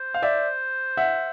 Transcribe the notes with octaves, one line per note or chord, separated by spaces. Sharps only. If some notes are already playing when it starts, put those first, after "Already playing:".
Already playing: C5
F5
D5 E5
E5 F#5